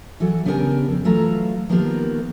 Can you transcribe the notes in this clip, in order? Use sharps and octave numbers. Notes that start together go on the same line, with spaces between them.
E3 F#3 F#4 A4
C#3 B3 D4 G4 A#4 G#5
F2
E3 F#3 A3 F4 A#5
D#3 F3 A#3 B3 G4 A#4